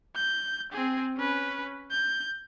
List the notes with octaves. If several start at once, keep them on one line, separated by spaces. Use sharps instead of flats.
G6
C4 G#4
C#4 B4
G6